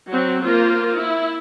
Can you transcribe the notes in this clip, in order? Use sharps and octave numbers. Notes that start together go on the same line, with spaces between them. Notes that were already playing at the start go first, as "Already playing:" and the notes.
F#3 C4
A#3 F4 A#4 C5
E4